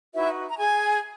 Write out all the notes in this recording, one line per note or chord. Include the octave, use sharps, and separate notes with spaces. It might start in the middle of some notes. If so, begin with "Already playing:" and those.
D#4 E4 F#4 B4 E5
A#5
G#4 G#5